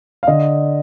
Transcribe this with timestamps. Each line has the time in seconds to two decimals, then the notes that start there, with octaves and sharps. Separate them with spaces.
0.23 F5
0.27 D3 D#5